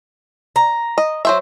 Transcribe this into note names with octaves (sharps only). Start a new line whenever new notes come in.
A#5
D#5
F#3 C5 E5